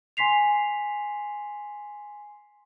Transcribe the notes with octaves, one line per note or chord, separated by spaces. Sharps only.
G#5 C6 B6 C7 F7